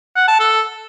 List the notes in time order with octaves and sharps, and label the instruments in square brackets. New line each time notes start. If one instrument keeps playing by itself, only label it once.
[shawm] F#5
A5
A4